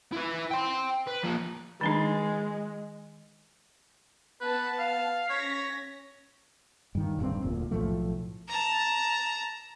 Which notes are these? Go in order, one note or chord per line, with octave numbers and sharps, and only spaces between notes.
E4 B4
G5 C6
B4
F3 A#3
D#3 G#3 D4 D#4
B3 B4 A5
F5
C#4 C#5 A#6 B6
G2 D#3
D1 G2 F#3 C4
E1 D2 A#2
B1 A2 F3 A3
A5 A#5